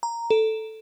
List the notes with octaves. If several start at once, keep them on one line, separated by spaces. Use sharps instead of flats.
A#5
A4